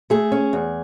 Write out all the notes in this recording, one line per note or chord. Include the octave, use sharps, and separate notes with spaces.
A3 G#4
C#4
E2